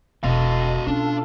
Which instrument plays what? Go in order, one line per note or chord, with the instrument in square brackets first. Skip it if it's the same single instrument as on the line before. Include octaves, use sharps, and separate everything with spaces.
[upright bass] E1 [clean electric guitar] B2 [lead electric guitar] F#4 F5 [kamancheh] A4 D#5
[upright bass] C#4 [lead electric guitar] D4 [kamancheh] F4 A4